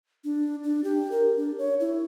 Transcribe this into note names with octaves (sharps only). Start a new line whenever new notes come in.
D4
D4
G4
A#4
D4
C#5
E4